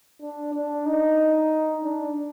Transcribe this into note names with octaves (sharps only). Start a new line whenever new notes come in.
D4
D4
D#4
D4